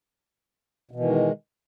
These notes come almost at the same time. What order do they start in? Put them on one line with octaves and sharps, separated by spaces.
B2 E3 D#3 G#3